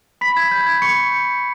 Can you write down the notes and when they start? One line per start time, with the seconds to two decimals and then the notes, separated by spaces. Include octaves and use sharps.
0.21 B5 B6
0.37 G#6
0.52 B5 G6
0.66 G#6
0.82 B5 C#6 C#7
1.12 G6